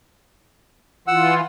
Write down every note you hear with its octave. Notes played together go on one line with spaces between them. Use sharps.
E3 F4 F#5 E6